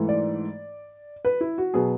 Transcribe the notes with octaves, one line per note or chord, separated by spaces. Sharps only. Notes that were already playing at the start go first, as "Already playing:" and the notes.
Already playing: G#2 E3 A3
D5
B4
E4
F#4
B2 F#3 B3 G#4